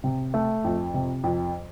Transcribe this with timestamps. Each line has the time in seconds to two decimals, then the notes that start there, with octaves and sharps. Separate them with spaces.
0.04 C3
0.34 A3
0.64 F2
0.94 C3
1.24 F2